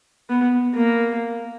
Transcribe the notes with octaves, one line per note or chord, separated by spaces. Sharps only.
B3
A#3